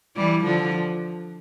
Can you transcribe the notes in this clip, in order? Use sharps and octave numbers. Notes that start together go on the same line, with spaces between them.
E3 G3
D3 F3